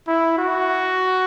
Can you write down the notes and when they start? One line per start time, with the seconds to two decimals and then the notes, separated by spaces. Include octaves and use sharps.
0.08 E4
0.38 F#4